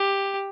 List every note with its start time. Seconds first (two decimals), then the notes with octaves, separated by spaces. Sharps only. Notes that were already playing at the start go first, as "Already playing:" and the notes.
Already playing: G4